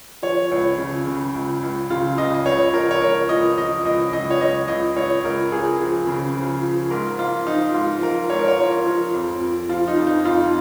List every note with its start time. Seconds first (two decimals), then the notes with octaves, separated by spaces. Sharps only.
0.23 F3 C#5
0.51 C#2 C#5
0.78 C#3
1.07 C#3
1.35 C#2
1.63 C#2
1.90 C#3 F4
2.18 C#2 D#5
2.34 D#5
2.45 C#2 C#5
2.73 F3 A#4
2.91 C#5
3.02 C#2 A#4
3.29 C#2 D#5
3.57 F3 D#5
3.85 C#2 D#5
4.13 C#2 D#5
4.30 C#5
4.41 C#2 D#5
4.68 C#2 D#5
4.96 C#2 C#5
5.24 C#2 A#4
5.52 C#2 G#4
5.80 F3
6.07 C#3
6.36 F3
6.63 F3
6.90 G#2 A#4
7.19 F3 F4
7.46 F3 D#4
7.74 G#2 F4
8.02 F3 A#4
8.30 G#2 C#5
8.39 A#4
8.48 C#5
8.58 F3 A#4
8.86 F3
9.14 F2
9.41 F3
9.69 F3 F4
9.88 D#4
9.97 F2
10.07 D#4
10.25 F2 F4